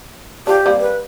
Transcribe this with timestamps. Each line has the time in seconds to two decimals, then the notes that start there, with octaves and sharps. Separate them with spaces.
0.47 F3 D4 G4
0.66 G3 A#3 C4
0.80 B4